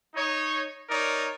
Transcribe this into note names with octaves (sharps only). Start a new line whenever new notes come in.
D#4 C#5
D#4 A#4 C#5 D5